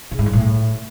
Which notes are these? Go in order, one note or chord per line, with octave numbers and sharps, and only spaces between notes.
C#3
G#2
G2
A2